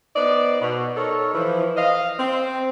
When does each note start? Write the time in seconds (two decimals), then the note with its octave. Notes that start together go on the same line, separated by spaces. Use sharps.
0.15 B3 D#4 C5 D5
0.60 B2
0.96 D#4 A4 A#4 C#5
1.33 E3 F3
1.76 D#5 F5
2.18 C4